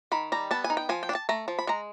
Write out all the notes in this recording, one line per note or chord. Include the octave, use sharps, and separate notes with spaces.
D#3 B5
G3 A#5
B3 A5
G#5
D#4
G5
F3 G#5
G5
D4
A5
A3 A#5
F3
B5
G#3 A#5